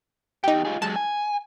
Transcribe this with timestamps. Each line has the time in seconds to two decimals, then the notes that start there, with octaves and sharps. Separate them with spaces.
0.44 E2 D#4 G4 G5
0.65 F4 G#4
0.82 F#3 G#3 A5
0.96 G#5